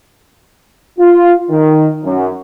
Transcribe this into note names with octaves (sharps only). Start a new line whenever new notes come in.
F4
D#3
F#2